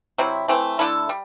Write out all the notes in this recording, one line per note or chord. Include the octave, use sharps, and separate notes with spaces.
C3 F#3 C4 E4
E3 A3 C4
D3 A3 E4 A4
G3